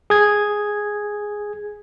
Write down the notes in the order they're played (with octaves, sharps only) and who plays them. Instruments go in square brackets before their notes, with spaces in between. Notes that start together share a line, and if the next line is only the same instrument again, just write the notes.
[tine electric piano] G#4 G#6